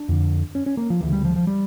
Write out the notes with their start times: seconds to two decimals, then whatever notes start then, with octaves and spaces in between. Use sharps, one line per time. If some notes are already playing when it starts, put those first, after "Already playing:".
Already playing: D4
0.09 F2 D3
0.55 C#4
0.66 C#4
0.77 A#3
0.90 F3
1.01 D2 C#3 E3
1.13 G3
1.25 F3
1.36 F3
1.47 G3